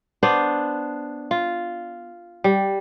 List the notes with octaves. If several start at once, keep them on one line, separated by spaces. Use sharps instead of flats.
B3 D4 C5
F4
G3